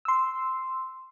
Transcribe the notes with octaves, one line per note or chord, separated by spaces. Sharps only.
C6 E6